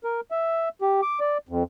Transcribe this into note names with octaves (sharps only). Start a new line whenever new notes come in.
A#4
E5
G4
D6
D5
F2